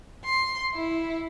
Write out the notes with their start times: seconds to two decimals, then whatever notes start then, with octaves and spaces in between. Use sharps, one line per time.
0.24 C6
0.74 E4